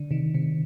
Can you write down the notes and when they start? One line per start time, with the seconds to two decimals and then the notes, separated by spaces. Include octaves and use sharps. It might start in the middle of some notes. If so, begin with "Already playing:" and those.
Already playing: D3
0.11 C3 D#3
0.35 C3